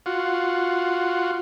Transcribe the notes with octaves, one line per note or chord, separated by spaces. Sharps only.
F4 F#4